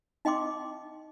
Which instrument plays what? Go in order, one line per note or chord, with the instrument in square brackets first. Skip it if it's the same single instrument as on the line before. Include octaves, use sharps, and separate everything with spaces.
[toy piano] D#4 D#5 G5 C6 D6